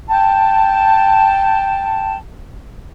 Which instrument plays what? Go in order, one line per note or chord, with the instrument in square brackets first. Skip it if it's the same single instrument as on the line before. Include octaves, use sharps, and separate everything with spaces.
[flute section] G5 A5